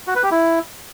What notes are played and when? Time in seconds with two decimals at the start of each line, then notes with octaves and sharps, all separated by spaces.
0.07 F#4
0.15 B4
0.23 G4
0.31 E4